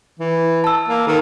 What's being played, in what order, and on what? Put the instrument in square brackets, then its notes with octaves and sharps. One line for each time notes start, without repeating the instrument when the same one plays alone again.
[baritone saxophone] E3
[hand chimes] A5 E6
[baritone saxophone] A#3
[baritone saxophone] D#3 [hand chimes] A4 A#4